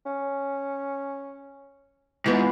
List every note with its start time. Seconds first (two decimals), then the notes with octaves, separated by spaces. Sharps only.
0.06 C#4
2.26 G#2 E3 B3 F4